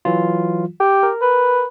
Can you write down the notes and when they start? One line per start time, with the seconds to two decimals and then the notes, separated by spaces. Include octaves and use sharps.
0.05 E3 F#3 F4
0.80 G4
1.03 A#4
1.22 B4